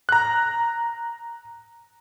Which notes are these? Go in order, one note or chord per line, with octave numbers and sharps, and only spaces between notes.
A#5 F#6